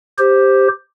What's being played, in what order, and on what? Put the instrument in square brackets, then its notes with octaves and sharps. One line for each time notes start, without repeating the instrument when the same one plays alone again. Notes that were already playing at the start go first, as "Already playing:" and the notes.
[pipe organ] G4 C5